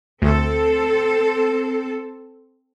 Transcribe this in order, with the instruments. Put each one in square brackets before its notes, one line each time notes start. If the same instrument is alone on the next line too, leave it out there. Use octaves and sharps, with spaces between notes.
[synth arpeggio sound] D2 [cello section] C4 A4